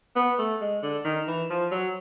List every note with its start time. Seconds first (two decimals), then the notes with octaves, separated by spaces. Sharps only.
0.16 B3
0.39 A3
0.61 G#3
0.83 D3
1.04 D#3
1.28 E3
1.50 F3
1.72 F#3